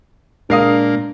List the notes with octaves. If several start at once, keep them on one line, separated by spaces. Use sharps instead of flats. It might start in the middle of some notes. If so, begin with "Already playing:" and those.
A#2 G#3 A#3 D4 A#4 F5 D#6